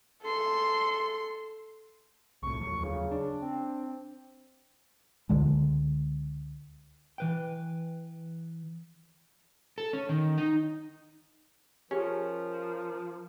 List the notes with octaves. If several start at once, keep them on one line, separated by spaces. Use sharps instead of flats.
A4 C6
C2 A2 C#6
F1 D#2 F#3
C#3
D4
C4
C#2 D3 G#3
E3 B4 G5
A4
C#4
D#3
D#4
F3 C#4 G4 G#4 A#4 G5